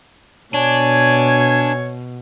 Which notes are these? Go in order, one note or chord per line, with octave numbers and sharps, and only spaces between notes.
B2 D4 C#5 G#5